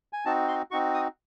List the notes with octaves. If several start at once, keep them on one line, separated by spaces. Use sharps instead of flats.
G#5
C4 D#4 F#4 A5
C6
C4 D#4 F#4 C#6
D#6